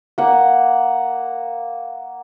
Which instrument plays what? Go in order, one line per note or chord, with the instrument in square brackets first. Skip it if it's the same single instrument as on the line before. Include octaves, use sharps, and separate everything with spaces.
[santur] A#3 F#5